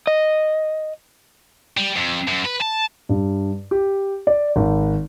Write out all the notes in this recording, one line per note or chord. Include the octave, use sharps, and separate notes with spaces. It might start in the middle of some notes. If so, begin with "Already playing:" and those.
D#5
G3
F2
F#2
B4
A5
G2
G4
D5
G#1